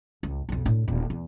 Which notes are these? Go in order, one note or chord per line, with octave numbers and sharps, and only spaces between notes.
C#2
B1 F2
A2 D4
D#1
E2